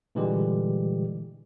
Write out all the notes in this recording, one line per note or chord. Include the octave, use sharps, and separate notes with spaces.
A#2 D3 E3 G3 G#3 G4